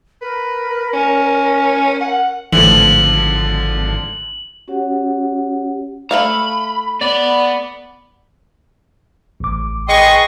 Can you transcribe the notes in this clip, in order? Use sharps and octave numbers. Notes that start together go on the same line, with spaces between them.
A#4 B4
C#4
F#5
G#1 A2 D3 E3 F3 F#7
C#4 F#4 G4 C#5 F#5
A3 E5 F5 A#5 B5
B3 D5 B5
A1 D6
G#4 B4 D#5 G5 C6 C#6